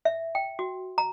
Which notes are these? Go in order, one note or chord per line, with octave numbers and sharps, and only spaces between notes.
E5
G5
F#4
A#5